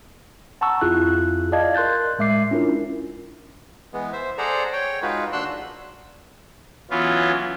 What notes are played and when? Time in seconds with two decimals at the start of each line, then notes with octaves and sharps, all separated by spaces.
0.61 F#5 A5 A#5 C#6 E6
0.81 F2 E4 F4 G#4 F#6
1.52 D5 D#5 F5 A5 G#6
1.74 A#4 C6 F#6 G6 A6
2.19 A2 G#3 E5 D6 C7
2.51 C#4 D4 E4 F4 A#4
3.93 E3 G#3 B3
4.12 C5 E5
4.38 G#4 A4 C5 D5 F#5 A#5
4.73 C#5 G5
5.02 G#3 D#4 F4 F#4 B4
5.33 D#2 D4 F#4 C6 E6 F#6
6.90 E3 F#3 B3 C#4 F4